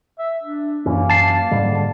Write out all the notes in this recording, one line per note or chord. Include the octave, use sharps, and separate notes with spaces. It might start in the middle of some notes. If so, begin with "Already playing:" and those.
E5
D4
F#2 E3 A#3 C#4
A5 C7
G#2 D3 G3